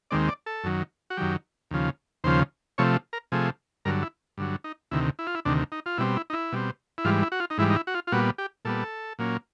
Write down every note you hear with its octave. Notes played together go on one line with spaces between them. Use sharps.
D#2 D#3 G#3 C4 D5
D5
A4
F#2 D#3 F#3
F#4
F#2 D#3 F#3 G4
D#2 C#3 F3
D#2 C#3 F3 C5
C3 F3 A3 C#5
A#4
C3 F3 A3 G#4
G2 D3 F#3 A#4
E4
G2 D3 F#3
D#4
D2 C3 D#3 E4
E4
F4
E4
D2 C3 D#3 D4
D#4
F4
B2 G3 C4 E4
E4
D#4
E4
B2 G3 C4
E4
G#2 E3 G3 F4
E4
F#4
F4
D#4
G#2 E3 G3 E4
D#4
E4
F#4
F4
F4
A#2 G3 B3 F#4
G4
A#2 G3 B3 A4
A#2 F#3 A#3 C#4